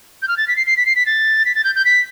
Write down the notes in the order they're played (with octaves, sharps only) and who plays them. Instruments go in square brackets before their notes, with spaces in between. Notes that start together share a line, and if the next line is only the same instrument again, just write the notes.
[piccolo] G6
F6
A6
B6
C7
C7
B6
C7
B6
A6
B6
A6
G6
G6
B6